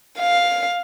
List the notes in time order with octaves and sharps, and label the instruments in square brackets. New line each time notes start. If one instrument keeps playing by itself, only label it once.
[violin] F5